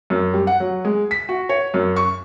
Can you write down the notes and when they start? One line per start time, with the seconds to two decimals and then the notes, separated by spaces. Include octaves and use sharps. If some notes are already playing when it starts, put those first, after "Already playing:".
0.10 F#2
0.34 G3
0.47 F#5
0.60 F#3
0.85 G#3
1.11 B6
1.29 F#4
1.49 C#5
1.74 F#2
1.96 C#6